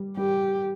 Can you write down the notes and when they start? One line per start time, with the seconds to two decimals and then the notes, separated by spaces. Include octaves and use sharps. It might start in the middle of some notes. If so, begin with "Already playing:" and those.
Already playing: G3
0.17 G3 G4